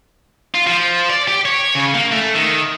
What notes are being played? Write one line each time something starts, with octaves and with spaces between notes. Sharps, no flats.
F4
F3
D5
G4
C#5
C#3
A#3
A3
D#3